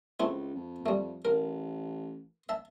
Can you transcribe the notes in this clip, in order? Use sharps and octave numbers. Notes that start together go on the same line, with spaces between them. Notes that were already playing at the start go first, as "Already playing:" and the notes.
C#2 A3 C4 E4
F2
G3 A3
A1 A#4
E5 A5